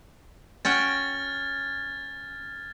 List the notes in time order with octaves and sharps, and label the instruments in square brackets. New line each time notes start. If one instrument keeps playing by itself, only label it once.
[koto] C#4 F#4 G5 [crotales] F6 G#6 A6